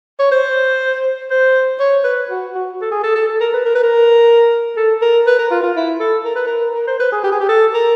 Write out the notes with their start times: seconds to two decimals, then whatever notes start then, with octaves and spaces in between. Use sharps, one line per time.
0.20 C#5
0.32 C5
1.31 C5
1.80 C#5
2.04 B4
2.30 F#4
2.55 F#4
2.82 A4
2.92 G#4
3.03 A4
3.16 A4
3.29 A4
3.41 A#4
3.54 B4
3.66 A#4
3.75 B4
3.83 A#4
4.77 A4
5.02 A#4
5.27 B4
5.39 A#4
5.51 F4
5.63 F4
5.76 E4
6.00 A4
6.25 A#4
6.36 B4
6.47 A#4
6.75 A#4
6.88 C5
7.00 B4
7.12 G#4
7.24 G4
7.32 G#4
7.40 G4
7.49 A4
7.74 A#4